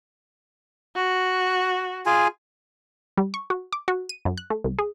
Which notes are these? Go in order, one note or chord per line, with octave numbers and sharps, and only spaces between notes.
F#4
F4 G#4 G#5
G3
C#6
F#4
D6
F#4
D#7
F#2
F#6
A3
C2
G#4